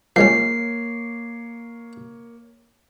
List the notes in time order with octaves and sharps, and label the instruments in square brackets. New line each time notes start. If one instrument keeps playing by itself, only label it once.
[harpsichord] F3 G#3 C#4 [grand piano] A#3 C#5 [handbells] C7